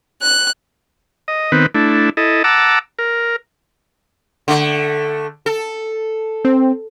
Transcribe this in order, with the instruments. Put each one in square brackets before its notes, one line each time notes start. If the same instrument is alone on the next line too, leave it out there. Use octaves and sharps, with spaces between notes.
[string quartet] F#6
[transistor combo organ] D#5
D#3 B3 C4 B4
A3 D4 E4
E4 A4 D#5
F#5 A5 A#5 D6 E6
A#4
[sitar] D3 A3
A4
[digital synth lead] C4